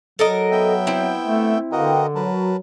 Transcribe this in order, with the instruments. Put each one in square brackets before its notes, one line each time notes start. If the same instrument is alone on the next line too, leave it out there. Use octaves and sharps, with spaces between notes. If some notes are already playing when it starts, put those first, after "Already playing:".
[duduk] F#3 [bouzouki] A4 A#4 D#5
[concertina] B3 E5 G5
[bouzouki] C4 E4
[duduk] A3
[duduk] D3 [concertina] F#4 A#4 D#5 [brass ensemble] B4 F5 G5
[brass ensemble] F#3 [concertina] A#4 B4 A5